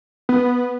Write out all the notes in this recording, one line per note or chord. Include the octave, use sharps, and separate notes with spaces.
B3